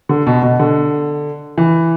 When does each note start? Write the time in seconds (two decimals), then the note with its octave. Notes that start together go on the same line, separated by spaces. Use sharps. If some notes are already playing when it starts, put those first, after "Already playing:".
0.09 D3
0.27 B2
0.43 B2
0.60 D3
1.58 E3